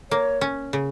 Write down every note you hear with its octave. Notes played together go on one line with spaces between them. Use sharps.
A#3 C#5
C#4
C#3